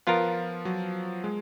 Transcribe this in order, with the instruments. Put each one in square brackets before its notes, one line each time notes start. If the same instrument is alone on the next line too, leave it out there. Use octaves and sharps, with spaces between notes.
[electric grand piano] F3 [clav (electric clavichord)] B3 F4 A#4
[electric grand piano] F#3
G#3